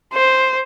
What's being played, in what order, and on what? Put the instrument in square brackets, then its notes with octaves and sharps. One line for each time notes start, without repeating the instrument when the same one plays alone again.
[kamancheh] C5